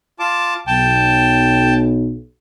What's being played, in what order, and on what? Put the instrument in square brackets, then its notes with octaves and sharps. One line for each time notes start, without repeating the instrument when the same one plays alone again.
[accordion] F4 A5 D6
[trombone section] B1 [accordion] G5 A5